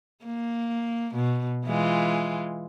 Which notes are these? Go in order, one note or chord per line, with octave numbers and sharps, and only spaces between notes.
A#3
B2
E3 G#3 F4